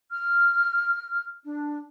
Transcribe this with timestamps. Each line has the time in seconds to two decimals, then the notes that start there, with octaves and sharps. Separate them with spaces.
0.11 F6
1.43 D4